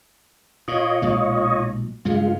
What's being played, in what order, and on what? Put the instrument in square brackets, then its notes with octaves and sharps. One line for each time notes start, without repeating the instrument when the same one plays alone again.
[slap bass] A#2 [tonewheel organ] F4 C#5 D#5
[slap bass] B1 A#2 G#3
[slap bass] G2 C#3 F#3 [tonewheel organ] G#3 F4